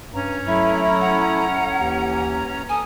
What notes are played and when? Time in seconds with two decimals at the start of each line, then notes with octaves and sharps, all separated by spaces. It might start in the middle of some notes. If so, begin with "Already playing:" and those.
0.14 G2 C#4 A#5
0.47 F#3 A3 E4 E5
1.01 F#5
1.79 D#2 E3
2.69 A4 G#5 D#6